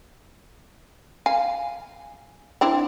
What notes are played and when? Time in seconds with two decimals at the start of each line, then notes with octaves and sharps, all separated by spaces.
1.26 F5 G#5
2.61 C4 D4 E4